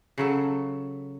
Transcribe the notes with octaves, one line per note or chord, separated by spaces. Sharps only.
C#3 F#3 A4